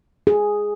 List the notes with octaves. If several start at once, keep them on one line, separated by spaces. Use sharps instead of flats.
G#4